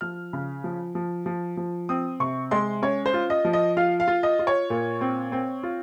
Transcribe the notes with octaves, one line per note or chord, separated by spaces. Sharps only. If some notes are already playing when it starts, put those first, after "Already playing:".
F3 F6
C#3
F3
F3
F3
F3
C4 D#6
C3 C#6
G#3 C6
C#4 C#5
C5
F4
D#5
F3
D#5
F4 F5
F5
F4
D#5
F4
C#5
A#2
C4
C4
F4